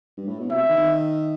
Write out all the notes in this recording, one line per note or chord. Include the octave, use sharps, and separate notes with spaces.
G2
A2
B2
C3 E5
D#3